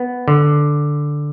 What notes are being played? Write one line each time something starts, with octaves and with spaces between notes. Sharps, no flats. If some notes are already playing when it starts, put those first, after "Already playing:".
Already playing: B3
D3